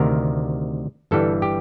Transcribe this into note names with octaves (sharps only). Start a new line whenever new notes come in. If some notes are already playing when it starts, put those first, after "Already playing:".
Already playing: D2 C3 D#3 A#4
G1 G2 E3 G3 A4
G4